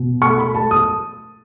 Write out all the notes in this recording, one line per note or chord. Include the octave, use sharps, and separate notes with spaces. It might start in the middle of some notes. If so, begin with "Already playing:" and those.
Already playing: B2
A3 C#6
B5
A3 A5
D#6